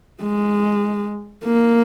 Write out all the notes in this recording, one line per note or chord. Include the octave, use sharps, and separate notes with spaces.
G#3
A#3